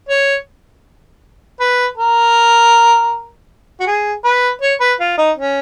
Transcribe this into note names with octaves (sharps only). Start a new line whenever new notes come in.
C#5
B4
A#4
F#4
G#4
B4
C#5
B4
F4
D#4
C#4